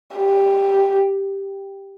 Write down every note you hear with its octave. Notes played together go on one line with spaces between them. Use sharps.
G4